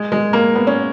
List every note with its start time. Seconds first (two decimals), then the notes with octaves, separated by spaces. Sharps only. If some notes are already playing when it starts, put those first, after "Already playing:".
Already playing: G#3
0.12 G#3
0.33 A#3
0.55 B3
0.67 C#4